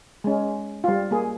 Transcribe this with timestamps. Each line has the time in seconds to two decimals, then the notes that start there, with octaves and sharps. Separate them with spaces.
0.24 G#3 C#4
0.84 G3 F4
1.11 A#3 G#4